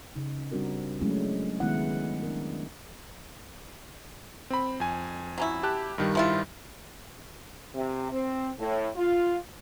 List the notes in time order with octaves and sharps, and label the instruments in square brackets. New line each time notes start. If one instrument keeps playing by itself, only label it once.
[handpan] C#3 D#4
G3 C4 D4 F#4 A#4
F#3 G#3 A3 C#4 D4 E4
D#3 G#3 B3 D#4 E4 F#5
D4 A#4
[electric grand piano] C4 B5
F2 G#5
[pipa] F#3 C#4 E4
[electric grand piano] G4 A5 F#6
G2 D#3 G3
[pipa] F3 E4 F4
[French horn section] C3
C4
A2
F4